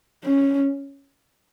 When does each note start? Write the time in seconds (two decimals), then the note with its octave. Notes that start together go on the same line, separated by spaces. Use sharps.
0.24 C#4